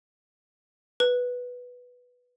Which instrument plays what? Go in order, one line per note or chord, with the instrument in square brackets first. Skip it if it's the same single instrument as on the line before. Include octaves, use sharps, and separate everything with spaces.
[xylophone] B4